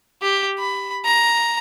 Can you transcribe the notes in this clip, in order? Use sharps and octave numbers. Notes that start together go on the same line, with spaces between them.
G4
B5
A#5